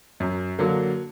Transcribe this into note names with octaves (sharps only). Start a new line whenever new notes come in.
F#2
D3 F#3 A#3